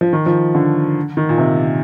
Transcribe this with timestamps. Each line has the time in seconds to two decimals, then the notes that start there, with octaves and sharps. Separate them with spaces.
0.01 F3
0.13 D#3
0.26 F3
0.55 D3
1.17 D#3
1.29 A#2
1.38 C3